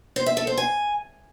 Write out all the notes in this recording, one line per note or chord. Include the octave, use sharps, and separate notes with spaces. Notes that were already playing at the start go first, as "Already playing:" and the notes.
C5
E5
A4
C5
G#5